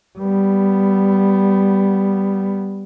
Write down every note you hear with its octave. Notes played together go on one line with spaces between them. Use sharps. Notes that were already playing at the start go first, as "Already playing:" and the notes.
G3 B3